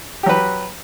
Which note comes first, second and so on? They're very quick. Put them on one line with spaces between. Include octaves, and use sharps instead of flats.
G4 F#3 B4